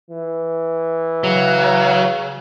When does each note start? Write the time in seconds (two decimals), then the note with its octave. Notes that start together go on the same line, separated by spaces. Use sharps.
0.10 E3
1.24 C#3 F#3